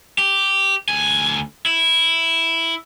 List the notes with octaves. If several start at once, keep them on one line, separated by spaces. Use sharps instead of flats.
G4
D2 G#5
E4